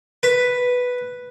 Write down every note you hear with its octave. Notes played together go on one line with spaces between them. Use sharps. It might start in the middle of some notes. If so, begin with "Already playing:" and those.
B4